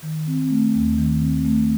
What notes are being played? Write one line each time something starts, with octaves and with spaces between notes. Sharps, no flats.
D#3
C4
A3
D#2
D#3
C4
A3